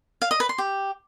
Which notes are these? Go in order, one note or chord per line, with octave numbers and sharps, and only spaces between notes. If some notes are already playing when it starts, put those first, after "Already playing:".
F5
D#5
B4
C6
G4